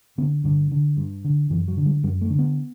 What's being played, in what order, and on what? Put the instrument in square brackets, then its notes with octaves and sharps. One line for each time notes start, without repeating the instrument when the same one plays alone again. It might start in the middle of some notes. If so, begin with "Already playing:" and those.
[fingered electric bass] D3 B3
G2 D3
D3
G2
D3
F#2 E3
F#3
D3
G3
F#2 G3
A3
D3
B3